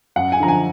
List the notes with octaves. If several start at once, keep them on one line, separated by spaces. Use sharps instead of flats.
F#2 F#5
G#5
D3 F3 A#5
G#5